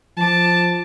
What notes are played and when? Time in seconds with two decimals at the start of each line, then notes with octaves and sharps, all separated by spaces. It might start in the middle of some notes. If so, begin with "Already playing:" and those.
0.17 F3 A5 D6